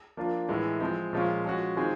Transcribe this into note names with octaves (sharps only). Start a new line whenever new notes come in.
F3 A#3 D4 F4
A2 E3 G#3
F3 G#3 C4
A#2 F3 G#3 C#4 F4
F3 G#3 C#4 F#4
D#3 G#3 C4 F4 G#4